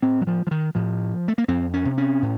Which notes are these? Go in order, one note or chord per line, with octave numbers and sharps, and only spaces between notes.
A2 C4
F#3
F3
F3
D#3
A2 F3
A3
A#3
F2 C4
C#4
C3
C#4
A2